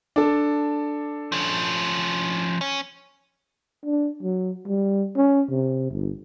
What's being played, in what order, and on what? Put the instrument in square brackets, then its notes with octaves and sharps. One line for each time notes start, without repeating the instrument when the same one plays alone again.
[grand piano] D4 A4
[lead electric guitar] F3 C#4
C#4
[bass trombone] D4
F#3
G3
C#4
C3
G1